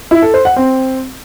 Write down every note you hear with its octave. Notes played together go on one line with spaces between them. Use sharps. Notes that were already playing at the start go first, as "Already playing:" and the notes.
E4
A4
C5
F#5
C4